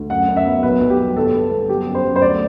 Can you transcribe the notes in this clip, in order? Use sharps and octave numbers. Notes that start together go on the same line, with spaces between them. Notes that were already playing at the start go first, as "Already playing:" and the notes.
Already playing: D2
F#2 F#5
F#2
E5
B3
B1 B4
B1
G4
G3
G1 A4
G1 B4
G1 A4
F#3 G4
F#2
C5
F#2
C5
D2 D5